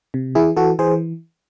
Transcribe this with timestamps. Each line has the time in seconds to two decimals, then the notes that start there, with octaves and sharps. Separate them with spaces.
0.14 C3
0.35 E3 E4 G#4
0.56 E3 F#4 A4
0.79 E3 G#4 C5